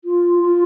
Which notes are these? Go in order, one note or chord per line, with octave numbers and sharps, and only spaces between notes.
F4
F4